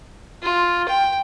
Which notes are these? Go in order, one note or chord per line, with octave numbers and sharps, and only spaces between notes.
F4
G5